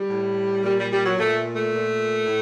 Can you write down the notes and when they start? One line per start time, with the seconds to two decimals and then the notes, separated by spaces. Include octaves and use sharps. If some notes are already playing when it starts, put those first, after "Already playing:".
Already playing: G3
0.09 A2
0.63 A#2 G3
0.78 G3
0.90 G3
1.04 F#3
1.17 A#2 A3
1.53 A3
1.72 A#2
2.26 A2